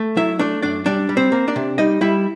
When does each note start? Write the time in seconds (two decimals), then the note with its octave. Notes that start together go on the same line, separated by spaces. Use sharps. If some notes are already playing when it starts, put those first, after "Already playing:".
Already playing: A3
0.17 F#3 E4 E5
0.39 A3 D4 D5
0.62 F#2 D4 D5
0.86 G3 D4 D5
1.09 G3
1.17 C4 C5
1.32 A#3
1.48 D4 D5
1.56 C3
1.78 G3 D#4 D#5
2.01 G3 E4 E5